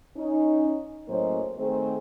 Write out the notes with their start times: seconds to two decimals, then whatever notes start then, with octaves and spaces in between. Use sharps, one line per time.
0.17 C#4 D#4
1.08 A2 F#3 A#3 C#4 C5 D#5
1.58 D#3 A3 C4 G#4 C5